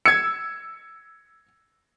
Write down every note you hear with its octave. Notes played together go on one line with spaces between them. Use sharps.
E6 G#6 C#7